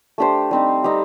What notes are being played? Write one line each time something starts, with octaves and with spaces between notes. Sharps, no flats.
A3 D4 G4 C5
G3 C4 D#4
G3 C4 D#4